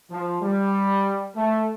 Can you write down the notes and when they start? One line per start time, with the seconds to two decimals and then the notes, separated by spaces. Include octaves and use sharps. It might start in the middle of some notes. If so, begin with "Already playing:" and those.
0.11 F3
0.42 G3
1.35 A3